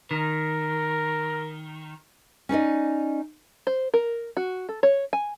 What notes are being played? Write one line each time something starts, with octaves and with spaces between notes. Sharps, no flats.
D#3 A#4
C#4 D#4 D5 D#5
C5
A#4
F#4
A4
C#5
G#5